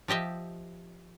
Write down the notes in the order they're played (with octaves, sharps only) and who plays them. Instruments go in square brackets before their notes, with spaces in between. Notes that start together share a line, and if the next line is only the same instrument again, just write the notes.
[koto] F3 G4 D#5 E5